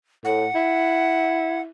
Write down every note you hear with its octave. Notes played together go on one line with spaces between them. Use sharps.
A2 F#5
E4